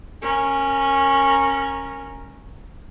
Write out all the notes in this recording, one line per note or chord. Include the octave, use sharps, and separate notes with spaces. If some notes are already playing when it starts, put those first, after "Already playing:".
C#4 A#4